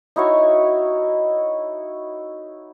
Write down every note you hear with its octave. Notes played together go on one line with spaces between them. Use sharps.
D#4 E4 F#4 C#5